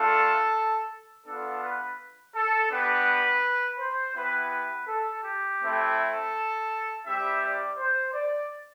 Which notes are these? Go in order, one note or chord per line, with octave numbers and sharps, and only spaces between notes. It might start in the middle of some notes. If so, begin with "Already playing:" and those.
Already playing: A3 D4 F4 A4
B3 D4 F4 A4
B4
A4
B3 D4 G4 B4
C5
B3 E4 G4 B4
B4
A4
G4
A3 C4 E4
A4
G3 C4 E4 G4 E5
D5
C5
D5